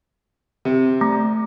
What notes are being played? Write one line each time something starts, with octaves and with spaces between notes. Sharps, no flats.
C3
A3